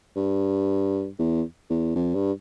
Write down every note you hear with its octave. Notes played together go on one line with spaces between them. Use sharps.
G2
E2
E2
F2
G2